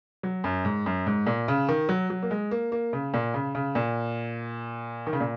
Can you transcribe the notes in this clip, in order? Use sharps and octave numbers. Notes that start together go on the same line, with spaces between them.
F#3
F#2
G#2
F#2
G#2
A#2
C#3
D#3
F#3
F#3
A#3
G#3
A#3
A#3
C#3
A#2
C#3
C#3
A#2
D#3
C#3
A#2